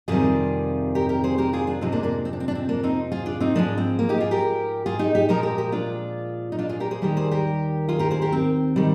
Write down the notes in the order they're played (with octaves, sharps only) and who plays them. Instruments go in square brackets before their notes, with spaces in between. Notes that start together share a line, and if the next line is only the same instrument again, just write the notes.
[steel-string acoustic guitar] F2 C3 D#3 G3 F4 G#4
G4 A#4
G4 A#4
G#4 C5
G4 A#4
F4 G#4
D4 F4
F2 C3 F3 G#3 C4 D#4
A#3 D4
A#3 D4
C4
D4
C4
D4
C4
A#3 D4
C4 D#4
F4 G#4
D4 F4
C4 D#4
G#2 F3 G#3 A#3 D4
C4
A#3
D#4 G4
F4 G#4
G4 A#4
F4 G#4
D#4 G4
D#4 G4
A#2 F3 G#3 G4 A#4
G4 A#4
G4 A#4
D4 F4
D#4
D4 F4
F4 G#4
G4 A#4
G#4 C5
D#2 D#3 G3 G4 A#4
G#4 C5
G4 A#4
F4 G#4
G4 A#4
G#4 C5
G4 A#4
C4
D#3 G3